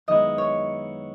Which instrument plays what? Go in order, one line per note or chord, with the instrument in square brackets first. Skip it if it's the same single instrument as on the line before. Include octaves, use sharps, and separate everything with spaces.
[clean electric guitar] F#2 D#3 G#3 B3 E4 [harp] D#5
[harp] C#5